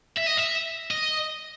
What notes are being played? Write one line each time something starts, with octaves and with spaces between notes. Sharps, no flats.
E5
D#5
E5
D#5